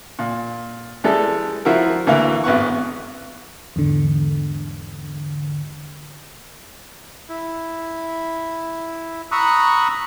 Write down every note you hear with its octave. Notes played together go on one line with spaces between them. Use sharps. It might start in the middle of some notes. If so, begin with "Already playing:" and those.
A#2
E3 G3 G#3 A4
F3 E4 F#4 A#4
D2 E3 A#3
G#1 B3 F#5 C#6
E2 G#2 D3
E4
A#5 B5 C#6 D#6 E6 F#6